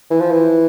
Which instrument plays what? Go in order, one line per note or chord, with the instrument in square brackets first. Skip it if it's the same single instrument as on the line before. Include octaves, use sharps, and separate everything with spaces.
[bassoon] E3
F3
E3